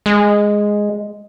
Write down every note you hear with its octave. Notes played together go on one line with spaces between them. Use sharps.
G#3